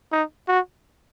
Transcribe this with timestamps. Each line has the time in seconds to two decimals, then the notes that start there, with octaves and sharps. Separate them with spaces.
0.12 D#4
0.48 F#4